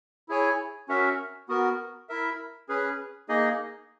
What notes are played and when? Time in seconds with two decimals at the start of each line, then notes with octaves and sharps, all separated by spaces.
0.29 E4 G#4 C#5 G#5
0.89 C#4 F#4 A#4 E5
1.49 B3 F#4 A#4
2.09 E4 A#4 E5
2.69 C#4 G#4 B4
3.29 A#3 D#4 G#4 D#5